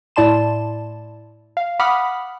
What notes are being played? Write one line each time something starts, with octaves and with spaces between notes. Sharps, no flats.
A2 E4 D5 A5 C6 E7
F5
F#5 B5 D6 D#6 F6 B6